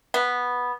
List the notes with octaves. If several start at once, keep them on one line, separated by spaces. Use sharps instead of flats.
B3